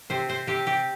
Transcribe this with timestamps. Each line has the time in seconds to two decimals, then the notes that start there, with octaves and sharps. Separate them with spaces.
0.10 C3 C5
0.29 C3 C5
0.47 C3 G4
0.67 C3 G4